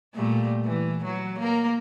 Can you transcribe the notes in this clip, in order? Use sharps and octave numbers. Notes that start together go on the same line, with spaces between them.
A#2 G3 A3
E3
F#3
A#3 A#4